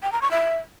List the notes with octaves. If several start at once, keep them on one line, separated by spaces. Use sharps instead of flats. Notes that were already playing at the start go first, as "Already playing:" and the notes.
G5
A#5
C#6
E5